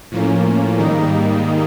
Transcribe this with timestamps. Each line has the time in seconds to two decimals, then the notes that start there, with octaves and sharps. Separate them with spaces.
0.12 A2 F3 A#3 C#4
0.78 G#2 D#3 G3 A#3 D#4